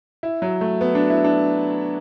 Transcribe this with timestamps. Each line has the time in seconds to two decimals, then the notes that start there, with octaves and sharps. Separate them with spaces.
0.23 E4
0.42 F#3
0.61 A3
0.81 B3
0.95 D4
1.10 E4
1.24 D4